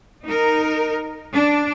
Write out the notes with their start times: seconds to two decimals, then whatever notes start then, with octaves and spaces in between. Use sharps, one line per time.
0.24 D#4 A#4
1.34 D4